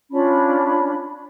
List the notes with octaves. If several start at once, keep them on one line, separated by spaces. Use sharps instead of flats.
C#4 D4 F4 B5